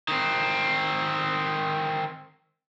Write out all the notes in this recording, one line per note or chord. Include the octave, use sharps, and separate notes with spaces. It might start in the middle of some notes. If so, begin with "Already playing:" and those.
D#3 C4